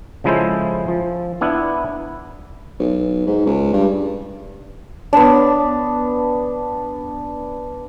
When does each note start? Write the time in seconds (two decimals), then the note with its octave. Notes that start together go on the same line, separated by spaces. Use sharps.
0.24 C#3 F3 G#3 E4 A4 C5
0.88 F3
1.41 B3 D4 E4
2.80 B1
3.27 G#2
3.46 C#2
3.73 G2
5.13 B3 D4